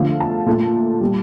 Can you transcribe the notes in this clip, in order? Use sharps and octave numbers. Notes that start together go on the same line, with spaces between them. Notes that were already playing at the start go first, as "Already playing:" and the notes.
Already playing: D3 F3 A3 F5
A5
A#2 A3
A#2 G3